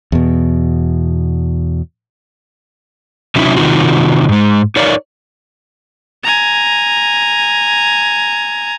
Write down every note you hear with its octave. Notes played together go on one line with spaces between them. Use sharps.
E2 B2
C3 F#3 C#4 D#4 E4
C3 D#3 D#4 F4 F#4
G#2 G#3
D#4 A#4 C#5 D5 F5
G#5 A#5